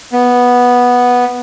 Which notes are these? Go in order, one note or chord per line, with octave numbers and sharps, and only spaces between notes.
B3